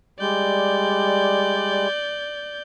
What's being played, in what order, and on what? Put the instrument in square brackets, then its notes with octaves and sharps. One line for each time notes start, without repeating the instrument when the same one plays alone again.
[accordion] G3 G#3 [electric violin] D5 G6